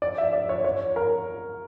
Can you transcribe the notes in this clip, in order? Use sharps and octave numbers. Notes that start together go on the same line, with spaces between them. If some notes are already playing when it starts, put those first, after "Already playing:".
D5
E5
D5
C#5
C#5
A#4